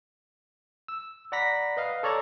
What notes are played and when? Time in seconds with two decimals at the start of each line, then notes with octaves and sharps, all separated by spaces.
0.88 E6
1.32 D5 F#5 A#5 B5 A#6 B6
1.77 B4 D#5 F5
2.03 A4 C#5 D5 A#5 C#6 G#6